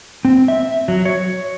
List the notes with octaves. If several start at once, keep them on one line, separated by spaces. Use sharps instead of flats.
C4
E5
F#3
C#5